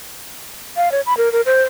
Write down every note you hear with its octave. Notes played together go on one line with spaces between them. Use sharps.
F5
C#5
B5
A#4
A#4
C5